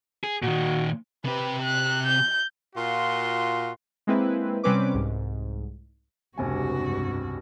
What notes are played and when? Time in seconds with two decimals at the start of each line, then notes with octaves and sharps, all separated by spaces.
0.24 G#4
0.43 A#2 D#3 F#4
1.25 C3 G4 B4
1.63 F#6
2.07 G6
2.75 A#2 F4 F#4 C6
4.07 G#3 A#3 C4 E4 B4
4.64 C3 G3 C4 C#4 B4 D6
4.94 C2 G#2
6.38 F1 C#2 G2 C3 F#4 G4 G#5